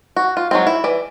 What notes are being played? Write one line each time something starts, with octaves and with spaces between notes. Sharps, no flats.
F#4
F4
F#3 G#3 C4
E4
E3 D5